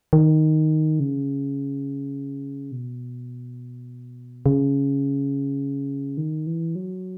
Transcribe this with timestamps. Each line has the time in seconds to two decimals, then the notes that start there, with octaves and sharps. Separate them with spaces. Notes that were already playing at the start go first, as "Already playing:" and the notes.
0.13 D#3
1.00 C#3
2.72 B2
4.46 C#3
6.17 D#3
6.47 E3
6.75 F#3